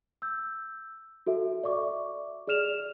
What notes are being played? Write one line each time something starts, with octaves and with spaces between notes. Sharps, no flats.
E6 G6
F#4 A4 E5
D5 E5 C#6 D6
G#4 D5 F6 E7 F7